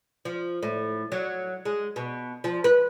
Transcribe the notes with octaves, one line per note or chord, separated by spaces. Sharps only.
F3
A2
F#3
G#3
B2
F3
B4